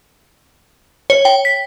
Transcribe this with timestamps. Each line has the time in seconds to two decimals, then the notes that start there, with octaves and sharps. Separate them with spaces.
1.10 C#5
1.25 G5
1.45 B6